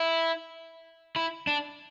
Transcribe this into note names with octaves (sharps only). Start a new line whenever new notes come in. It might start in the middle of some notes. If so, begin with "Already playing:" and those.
Already playing: E4
E4
D4